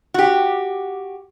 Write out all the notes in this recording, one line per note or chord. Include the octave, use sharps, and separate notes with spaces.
F#4 G4